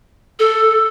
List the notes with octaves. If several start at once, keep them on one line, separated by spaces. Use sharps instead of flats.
A4